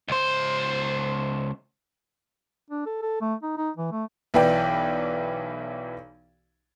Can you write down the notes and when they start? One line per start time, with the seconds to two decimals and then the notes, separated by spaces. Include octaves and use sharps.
0.09 C#2 C5
2.70 D4
2.86 A4
3.02 A4
3.21 A3
3.43 D#4
3.57 D#4
3.77 E3
3.92 A3
4.34 B1 E3 B4 D5 G5